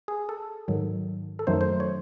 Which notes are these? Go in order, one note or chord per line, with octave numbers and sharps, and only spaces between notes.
G#4
A4
G#2 D#3 F#3
A4
F#2 D#3 F#3 A3 D#4 C5
C5
C#5